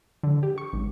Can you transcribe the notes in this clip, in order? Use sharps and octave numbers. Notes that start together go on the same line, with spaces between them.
D3
G4
C#6
G#1